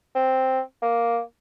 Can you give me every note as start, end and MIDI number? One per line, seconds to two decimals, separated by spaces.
0.15 0.61 60
0.82 1.21 58